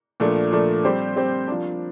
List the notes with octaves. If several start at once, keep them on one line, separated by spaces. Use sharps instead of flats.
A#2 F3 A3 D4
A#2 F3 A3 D4
G3 C4 G4 C5
G3 C4 G4 C5
F3 A#3 D4